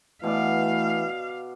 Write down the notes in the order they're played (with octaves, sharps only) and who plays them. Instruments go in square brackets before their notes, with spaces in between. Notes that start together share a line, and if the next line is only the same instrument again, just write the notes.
[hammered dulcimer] B2 D5 [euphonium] E3 [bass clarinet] A3 [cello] F5